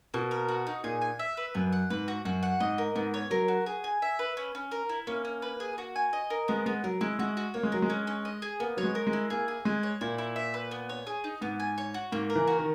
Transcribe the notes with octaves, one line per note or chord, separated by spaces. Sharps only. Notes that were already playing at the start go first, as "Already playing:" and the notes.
B2 A#3
A#4
F#4
D#4
A#2 G#4
G#5
E5
B4
F#2 B3
F#5
G#2 B4
F#4
F#2 F#4
F#5
G#2 D#5
A#4
G#2 B3
C#5
F#3 A#4
F#4
G#4
G#5
E5
B4
C#4
C#4
A#4
E4
A#3 C#4
C#4
B4
G#4
F#4
G#5
D#5
A#4
G#3 B3
G#3 B3
F#3 A#4
G#3 E4
G#3 F#4
F#4
A#3 C#5
G#3
F#3 A#4
G#3
C#4
C#4
D#5
G#4
A#3 B3
F#3 C#5
G#3
A#4
G#3
E4
A#3 G#4
G#4
G#3 G#5
C#5
A#2 E4
E4
E5
B4
B3
C#5
G#4
D#4
G#2 B3
G#5
C#5
F#4
G#2 A#3
A#4
E3
F#4
D#3